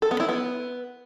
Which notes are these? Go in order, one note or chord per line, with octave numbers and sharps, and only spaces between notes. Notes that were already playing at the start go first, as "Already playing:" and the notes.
A4
B3
E4
B3